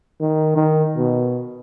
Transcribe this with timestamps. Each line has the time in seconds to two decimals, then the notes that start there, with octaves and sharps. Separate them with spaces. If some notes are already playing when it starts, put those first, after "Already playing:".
0.21 D#3
0.56 D#3
0.97 B2